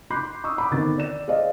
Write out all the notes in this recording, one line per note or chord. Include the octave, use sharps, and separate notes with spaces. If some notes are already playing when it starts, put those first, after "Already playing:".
B5 C6 D6 F#6 G6 C7
C#6 D#6 E6
B5 D6
B2 D3 D#3 C4 A6
D5 E7
G#4 C5 D5 D#5 F5